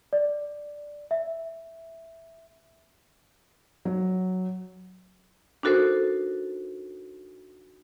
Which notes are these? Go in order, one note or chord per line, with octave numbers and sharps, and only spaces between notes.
D5
E5
F#3
D4 D#4 F#4 A4 A#4 C5